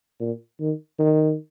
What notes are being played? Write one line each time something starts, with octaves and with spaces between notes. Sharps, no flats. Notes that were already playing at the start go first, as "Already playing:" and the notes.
A#2
D#3
D#3